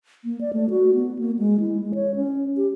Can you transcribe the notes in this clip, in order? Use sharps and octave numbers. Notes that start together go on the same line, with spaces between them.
A#3
D5
A3
F#4
B3
A#3
G#3
E4
G#3
C#5
C#4
G4